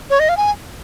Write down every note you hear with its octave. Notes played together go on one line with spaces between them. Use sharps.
C#5
D#5
F5
G#5